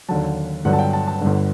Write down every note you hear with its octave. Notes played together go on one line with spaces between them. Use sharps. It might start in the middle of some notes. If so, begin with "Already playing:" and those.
D#2 D3 F#3 A5
G1 G2 D3 F#3 F#5
A5
G5
A5
A5
G1 G2 D3